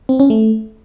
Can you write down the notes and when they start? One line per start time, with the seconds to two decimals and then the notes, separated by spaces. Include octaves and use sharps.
0.09 C4
0.20 C#4
0.30 A3